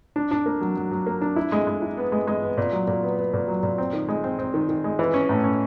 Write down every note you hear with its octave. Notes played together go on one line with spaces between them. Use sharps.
D4
D4
A#3
F#3
F#3
F#3
A#3
D4
E4
G#3
G#3
E4
B3
G#3
G#3
B3
A#2
F#3
A#2
B3
B3
A#2
F#3
A#2
C4
D#3
G#3
C4
C4
D#3
D#3
G#3
E3
C#4
A2
C#4